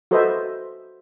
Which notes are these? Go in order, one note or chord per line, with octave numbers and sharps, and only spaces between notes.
F#4 A4 B4 C5 D#5 E5